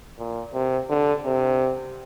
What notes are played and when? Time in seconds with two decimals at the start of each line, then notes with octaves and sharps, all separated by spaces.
0.18 A#2
0.54 C3
0.90 D3
1.25 C3